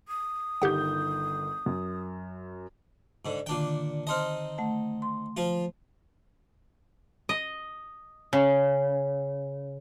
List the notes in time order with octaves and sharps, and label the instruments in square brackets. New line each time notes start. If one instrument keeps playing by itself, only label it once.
[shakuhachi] D#6
[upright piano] G1 D#3 G6 [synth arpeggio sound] G4 F#5
[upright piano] F#2
[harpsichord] G#2 D3
[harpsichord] A#2 D4 G5 [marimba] D3 D#3
[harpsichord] C4 D#4 D#5 [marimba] A5 C6 F6
[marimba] A3 F#5 A5
C6
[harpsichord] F3 F4
[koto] D#5
C#3